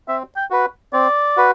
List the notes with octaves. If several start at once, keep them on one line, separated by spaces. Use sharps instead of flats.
C4 E5
G5
F#4 B4
C4 D5
F#4 B4